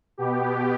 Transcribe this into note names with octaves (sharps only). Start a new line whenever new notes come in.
B2 B3 G4